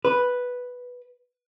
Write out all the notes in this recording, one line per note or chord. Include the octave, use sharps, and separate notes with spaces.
B4